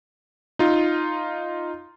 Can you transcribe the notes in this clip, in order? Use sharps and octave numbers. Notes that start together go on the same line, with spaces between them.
D#4 F4